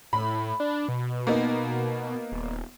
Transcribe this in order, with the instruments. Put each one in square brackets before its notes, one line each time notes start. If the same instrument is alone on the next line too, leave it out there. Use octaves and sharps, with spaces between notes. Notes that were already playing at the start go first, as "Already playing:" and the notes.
[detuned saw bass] A2 [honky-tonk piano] B5
[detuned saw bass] D4
B2
[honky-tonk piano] A#3 B3 D#4
[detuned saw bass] D#1